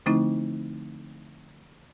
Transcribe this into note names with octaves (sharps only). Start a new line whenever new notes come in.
D3 F3 A3 C4 D#4 E4